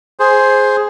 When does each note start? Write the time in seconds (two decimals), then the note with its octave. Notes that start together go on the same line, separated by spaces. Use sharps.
0.20 G#4 C5